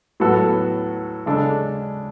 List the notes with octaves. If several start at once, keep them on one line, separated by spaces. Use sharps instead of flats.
A2 F#3 B3 F#4 A4
C#3 G#3 D4 A4